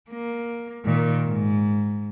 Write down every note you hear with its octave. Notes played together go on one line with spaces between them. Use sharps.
A#3
A#2 D#3
G#2